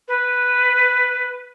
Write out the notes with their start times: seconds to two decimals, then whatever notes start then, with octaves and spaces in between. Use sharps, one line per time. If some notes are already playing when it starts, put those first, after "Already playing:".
0.08 B4